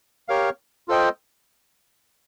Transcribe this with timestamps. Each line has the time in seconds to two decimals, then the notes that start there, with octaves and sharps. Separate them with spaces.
0.28 G4 A#4 C#5 F5
0.88 F4 A4 C5 D#5 G5